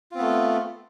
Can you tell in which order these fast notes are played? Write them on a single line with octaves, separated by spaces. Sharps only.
F4 C4 B3 A3